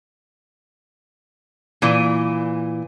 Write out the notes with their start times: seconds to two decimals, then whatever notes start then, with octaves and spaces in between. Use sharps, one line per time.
1.82 A#2 E3